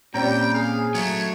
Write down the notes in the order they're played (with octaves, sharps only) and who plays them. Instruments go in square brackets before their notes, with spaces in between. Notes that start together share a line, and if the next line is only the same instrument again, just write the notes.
[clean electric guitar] A#2 [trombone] G3 [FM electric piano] C4 C#4 A#5 [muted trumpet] G5
[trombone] G#4 [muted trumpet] F5
[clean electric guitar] F#3 A3 [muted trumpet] C#5